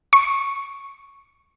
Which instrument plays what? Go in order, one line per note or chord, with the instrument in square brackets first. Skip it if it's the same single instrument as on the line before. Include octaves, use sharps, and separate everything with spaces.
[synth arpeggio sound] C#6